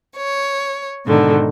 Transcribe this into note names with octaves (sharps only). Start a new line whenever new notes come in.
C#5
G#2 B2 D3 D#3